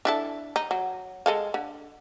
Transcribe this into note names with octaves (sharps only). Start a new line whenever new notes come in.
D4 E4 A4
D#4
F#3
G#3 A4 F5
D3